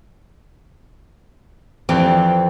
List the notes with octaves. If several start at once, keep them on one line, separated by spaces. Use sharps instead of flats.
F2 E3 C4 G4 D5